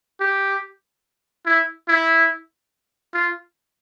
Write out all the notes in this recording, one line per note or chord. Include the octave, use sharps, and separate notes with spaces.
G4
E4
E4
F4